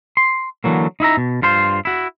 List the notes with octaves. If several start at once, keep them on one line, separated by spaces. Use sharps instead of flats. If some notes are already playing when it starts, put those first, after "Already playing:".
C6
D3 E3 F#3 A#3
D#4 E4 E5 A#5
B2
G2 F4 C5 C6
E4 F#4